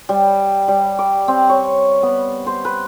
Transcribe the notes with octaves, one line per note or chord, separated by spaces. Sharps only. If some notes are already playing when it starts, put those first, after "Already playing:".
G3
G3
D6
C4
C#5
B3
C5
B4